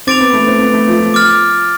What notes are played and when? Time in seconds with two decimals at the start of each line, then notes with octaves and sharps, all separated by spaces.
0.07 C4 D6 A6 D7 F7
0.21 B3
0.34 A3
0.47 C4
0.61 B3
0.74 A3
0.88 F3
1.01 F3
1.14 D6 F6 A6